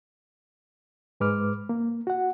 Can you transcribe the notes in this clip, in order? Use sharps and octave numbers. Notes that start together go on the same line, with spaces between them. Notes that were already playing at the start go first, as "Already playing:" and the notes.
G#2 G#3 B4 D6 F6
A#3
F#4 F#5